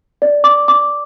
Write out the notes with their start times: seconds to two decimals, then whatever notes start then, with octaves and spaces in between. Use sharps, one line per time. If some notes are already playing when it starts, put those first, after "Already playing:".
0.22 D5
0.44 D6
0.68 D6